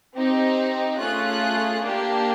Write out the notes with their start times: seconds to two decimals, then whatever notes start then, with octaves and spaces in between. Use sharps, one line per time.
0.14 C4 D#4 G4
0.99 A3 C#4 F4 G#4 F#6
1.82 A#3 D4 G4